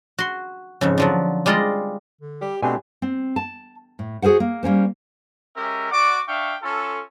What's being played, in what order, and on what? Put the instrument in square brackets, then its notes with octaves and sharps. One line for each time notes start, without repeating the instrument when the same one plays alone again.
[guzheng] F#4 C6
F2 G#2 C#3
D3 F3 F#3
G3 G#3 F4 D5 D#5
[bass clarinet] D3
[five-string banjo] G3 [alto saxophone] G4
[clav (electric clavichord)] B2 A3 D4 [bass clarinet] C4 [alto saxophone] G4 [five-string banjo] G#5
[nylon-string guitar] C4
A5
A2
F#4 G#4 A#4 C5 F#5
A#3
G3 A#3 C#4 C5
[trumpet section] G#3 C#4 G4 A#4 E5
F#4 D5 F#5 D6
D4 E5 F5 G5 C#6
C#4 F4 A4